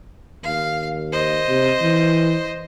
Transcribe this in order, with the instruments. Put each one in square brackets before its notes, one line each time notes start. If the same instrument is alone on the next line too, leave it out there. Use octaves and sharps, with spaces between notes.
[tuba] D#2 [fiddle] F5
[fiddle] C5 D#5
[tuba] C3
E3